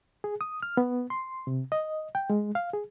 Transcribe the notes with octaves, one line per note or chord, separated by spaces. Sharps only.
G#4
D#6
F6
B3
C6
C3
D#5
G5
G#3
F5
G#4